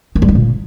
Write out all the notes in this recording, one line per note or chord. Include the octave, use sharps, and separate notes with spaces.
D#3
G3
D#3
A#2